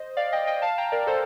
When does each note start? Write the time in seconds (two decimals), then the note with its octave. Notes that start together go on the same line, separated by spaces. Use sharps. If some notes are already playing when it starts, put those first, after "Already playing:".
Already playing: C5 D#5
0.17 D5 F5
0.32 D#5 G5
0.47 D#5 G5
0.62 F5 A5
0.78 G5 A#5
0.92 A#4 D5
1.07 A4 C5